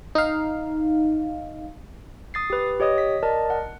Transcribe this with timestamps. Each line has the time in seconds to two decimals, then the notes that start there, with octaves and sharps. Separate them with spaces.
0.15 D#4 F5
2.34 D#6 A6 C7
2.50 G4 B4
2.80 G4 C#5 D#5 D#6
2.98 B6
3.23 A#4 D5 D#5 A5
3.50 F#5